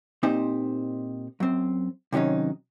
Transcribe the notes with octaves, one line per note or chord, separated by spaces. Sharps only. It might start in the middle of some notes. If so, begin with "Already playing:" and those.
A#2 C4 D#4 G4 C5
F#2 C4
C3 D#3 F#3 C#4 D#4